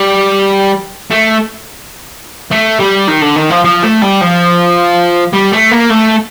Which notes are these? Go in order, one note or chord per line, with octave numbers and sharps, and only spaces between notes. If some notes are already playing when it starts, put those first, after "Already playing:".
Already playing: G3
A3
A3
G3
D#3
D3
D#3
F3
F3
A3
G3
F3
G3
A3
A#3
A3